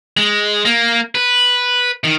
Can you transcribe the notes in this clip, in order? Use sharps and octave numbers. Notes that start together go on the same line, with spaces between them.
G#3
A#3
B4
D#3